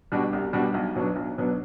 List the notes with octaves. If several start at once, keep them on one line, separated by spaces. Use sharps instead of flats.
B2 G3 D4 F#4
C2
B2 G3 D4 F#4
B1
B2 F#3 B3 D4
B1
B2 F#3 B3 D4